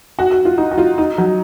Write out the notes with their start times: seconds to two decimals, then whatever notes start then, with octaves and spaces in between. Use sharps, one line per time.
0.19 F#4
0.31 F#4
0.45 F4
0.58 D#4
0.71 F#4
0.78 F4
0.98 D#4
1.18 F#3